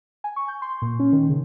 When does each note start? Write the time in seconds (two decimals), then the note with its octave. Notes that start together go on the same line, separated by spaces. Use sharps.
0.24 G#5
0.36 C#6
0.48 G6
0.62 C6
0.82 A#2
1.00 C#4
1.12 D#3
1.29 C#3